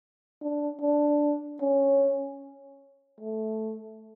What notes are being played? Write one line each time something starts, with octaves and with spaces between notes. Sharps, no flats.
D4
D4
C#4
A3